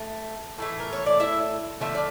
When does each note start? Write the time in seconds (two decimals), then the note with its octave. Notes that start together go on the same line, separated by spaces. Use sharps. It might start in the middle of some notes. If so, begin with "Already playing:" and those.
Already playing: A3
0.58 A2 E3 A3
0.80 A#4
0.93 C#5
1.06 D5
1.20 E4 E5
1.80 D3 F3 A3 E4 E5
1.95 D5